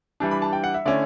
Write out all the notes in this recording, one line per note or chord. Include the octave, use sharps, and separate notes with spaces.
E3 G3 D4 A5
B5
A5
G5
F#5
E5
D3 A3 C#4 E4 D5